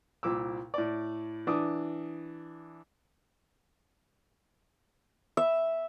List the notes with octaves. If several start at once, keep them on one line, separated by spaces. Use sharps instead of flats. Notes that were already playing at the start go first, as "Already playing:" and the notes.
C2 A#2 D6 E6
A2 D5
E3 D4 D6 D#6
E5